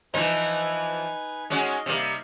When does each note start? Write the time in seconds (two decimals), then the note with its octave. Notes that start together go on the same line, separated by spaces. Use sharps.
0.14 E3 F3 D#4 B4 G#5
1.50 G#3 C#4 F#4 D#5 F6
1.86 C3 G3 A#3